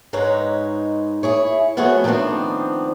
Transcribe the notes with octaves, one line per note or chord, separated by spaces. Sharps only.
G#2 G#3 D#4 B4 C#5
E4 G#4 C#5
F3 A3 B3 F#4 G#4 C#5
D3 D#3 F3 B3 C4 D4